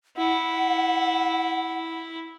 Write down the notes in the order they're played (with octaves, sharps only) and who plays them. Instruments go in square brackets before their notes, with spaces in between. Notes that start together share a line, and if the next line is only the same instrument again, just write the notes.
[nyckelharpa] E4 [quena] F#5